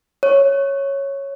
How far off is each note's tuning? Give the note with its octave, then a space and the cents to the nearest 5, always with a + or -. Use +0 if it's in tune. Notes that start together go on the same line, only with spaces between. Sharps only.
C#5 -5